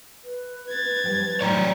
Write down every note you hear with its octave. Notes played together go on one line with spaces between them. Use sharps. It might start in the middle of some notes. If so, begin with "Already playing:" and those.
B4
G#6 A6
F3 G3 G5
A2 F#3 D#4 C#5 D5 G5 A#5